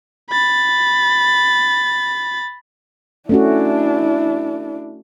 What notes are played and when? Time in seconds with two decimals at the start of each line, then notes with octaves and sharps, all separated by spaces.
0.30 B5 A6
3.29 A3 C#4 D4 E4 F#4